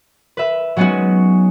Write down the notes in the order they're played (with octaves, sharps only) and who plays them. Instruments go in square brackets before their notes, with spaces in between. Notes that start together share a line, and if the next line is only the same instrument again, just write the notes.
[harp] B4 E5
F#3 G#3 B3 C#4 D#4 F#4